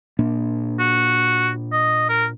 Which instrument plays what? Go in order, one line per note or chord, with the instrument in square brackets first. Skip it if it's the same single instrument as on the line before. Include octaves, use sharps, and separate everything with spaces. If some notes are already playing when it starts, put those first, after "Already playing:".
[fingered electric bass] A#2 A#3 D4
[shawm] F#4
D#5
A#4